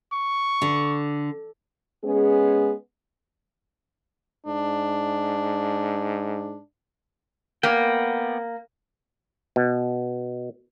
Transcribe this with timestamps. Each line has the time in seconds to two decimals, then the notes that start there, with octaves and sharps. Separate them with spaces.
0.13 C#6
0.62 D3
2.04 G#3 B3 C#4 G#4
4.46 G#2 D4
7.63 A#3 B3 D5 G5
9.56 B2